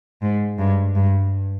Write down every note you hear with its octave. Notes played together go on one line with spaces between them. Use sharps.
G#2
G2
G2